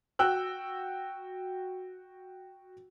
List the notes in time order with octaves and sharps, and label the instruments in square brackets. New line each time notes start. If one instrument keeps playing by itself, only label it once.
[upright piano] F#4 G5 E6 F#6